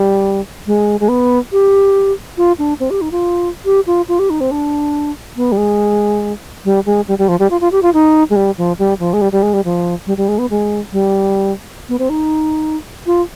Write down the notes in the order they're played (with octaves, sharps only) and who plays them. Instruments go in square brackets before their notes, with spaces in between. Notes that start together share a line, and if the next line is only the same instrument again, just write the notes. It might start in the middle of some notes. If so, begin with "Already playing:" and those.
Already playing: [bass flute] G3
G#3
G#3
B3
G4
F4
D4
C4
G4
D#4
F4
G4
F4
F4
G4
D#4
C4
D4
B3
G3
G#3
G3
G#3
G3
G3
F3
G3
F4
F4
G4
F4
D#4
G#3
G3
F3
G3
F3
G#3
G3
G3
G#3
G3
F3
G3
G3
G#3
B3
G#3
G3
B3
C4
D#4
F4